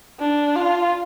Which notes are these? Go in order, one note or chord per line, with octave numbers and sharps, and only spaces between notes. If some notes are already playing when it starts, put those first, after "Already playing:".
D4
F4